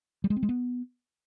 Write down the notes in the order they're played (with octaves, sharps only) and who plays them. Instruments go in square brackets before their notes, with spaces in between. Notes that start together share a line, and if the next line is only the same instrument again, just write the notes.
[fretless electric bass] G3
G#3
C4
G#3
B3